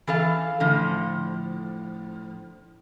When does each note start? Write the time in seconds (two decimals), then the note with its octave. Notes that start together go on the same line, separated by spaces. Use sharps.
0.07 E3 A4 F5
0.60 A2 D3 F3